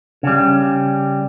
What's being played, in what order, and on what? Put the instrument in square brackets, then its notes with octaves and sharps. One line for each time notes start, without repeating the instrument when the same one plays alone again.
[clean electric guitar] C#3 G3